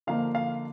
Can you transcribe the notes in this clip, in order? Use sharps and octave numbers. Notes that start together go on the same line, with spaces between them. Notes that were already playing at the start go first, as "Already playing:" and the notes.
D3 F3 A#3 D#4 F5
F5